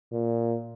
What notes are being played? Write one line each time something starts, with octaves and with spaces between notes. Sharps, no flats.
A#2